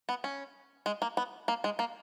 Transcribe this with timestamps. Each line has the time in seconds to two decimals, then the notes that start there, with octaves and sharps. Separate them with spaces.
0.09 B3
0.24 C#4
0.86 G#3
1.02 A#3
1.17 B3
1.48 A#3
1.64 G#3
1.79 A#3